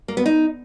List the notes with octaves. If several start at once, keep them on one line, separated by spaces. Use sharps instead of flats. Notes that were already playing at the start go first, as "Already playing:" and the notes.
A#3
B3
D#4